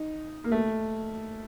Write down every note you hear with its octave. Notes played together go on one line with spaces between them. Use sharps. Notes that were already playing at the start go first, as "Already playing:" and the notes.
Already playing: D#4
A#3
A3